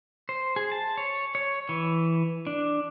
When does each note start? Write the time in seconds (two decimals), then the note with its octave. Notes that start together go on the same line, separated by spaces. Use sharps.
0.29 C5
0.56 G#4
0.72 A5
0.97 C#5
1.35 C#5
1.69 E3
2.47 D4